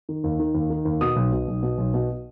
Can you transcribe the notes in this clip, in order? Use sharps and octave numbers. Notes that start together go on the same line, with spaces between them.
D#3
D#2
D#3
D#2
D#3
D#2
B2 D#6
B1
B2
B1
B2
B1
B2